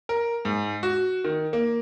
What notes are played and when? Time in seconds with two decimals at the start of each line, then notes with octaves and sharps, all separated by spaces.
0.09 A#4
0.45 G#2
0.83 F#4
1.24 D#3
1.53 A#3